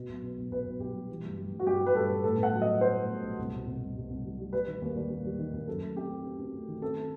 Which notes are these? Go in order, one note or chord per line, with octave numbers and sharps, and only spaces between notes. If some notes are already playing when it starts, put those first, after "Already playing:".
Already playing: B2
B1
B3
B1
B1 B4
B1
B1 G4
G3
E3
G2
G2
G2
F#4
G2 G4
G3
B4
G2 A4
G2
A2 A4
B3
F#5
F#3
D#5
B3
B3 C5
A2
B3
B1
C2
B2
C2
C2
G3
C2
G3
G3
G3 B4
D#3
D#2
G3
D#2
G3
D#3
D#2
F#2 A4
A3
C4 G4
C4
C4
C4
A3
D#3
C4 A4
C4